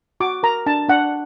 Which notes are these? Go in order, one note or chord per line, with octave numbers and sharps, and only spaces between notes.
F#4 D6
A#4 A#5
D4 A5
D4 F#5